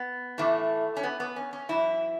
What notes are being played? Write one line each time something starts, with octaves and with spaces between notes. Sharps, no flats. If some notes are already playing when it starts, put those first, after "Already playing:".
Already playing: B3
A2 E3 A3
C#4
B3
B3
C#4
C#4
F#2 E3 E4